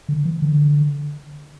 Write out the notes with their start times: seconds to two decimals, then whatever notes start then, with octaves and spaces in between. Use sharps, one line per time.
0.09 D3
0.25 E3
0.42 D3